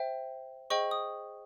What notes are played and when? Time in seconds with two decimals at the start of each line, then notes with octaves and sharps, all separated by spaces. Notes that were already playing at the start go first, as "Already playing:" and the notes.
Already playing: C5 E5 G5
0.70 G#4 C5 D#5 G5 C#6
0.91 D#6